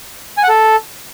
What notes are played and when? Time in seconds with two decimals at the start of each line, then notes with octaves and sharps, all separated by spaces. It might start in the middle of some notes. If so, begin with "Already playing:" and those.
0.37 G#5
0.43 F#5
0.49 A4